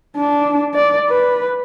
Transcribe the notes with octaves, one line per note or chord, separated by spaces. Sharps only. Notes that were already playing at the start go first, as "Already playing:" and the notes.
D4
D5
B4